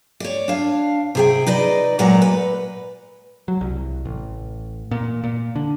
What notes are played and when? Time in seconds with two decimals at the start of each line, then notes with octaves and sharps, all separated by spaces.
0.20 C#5 D5
0.48 D4 F5
1.15 C3 G#4 G5
1.47 D#4 B4 D5 D#5
1.99 A#2 F#3 G#3 D5 F#5 A#5
2.22 B4
3.48 F#3
3.61 C2
4.05 A1
4.91 A#2
5.24 A#2
5.56 D3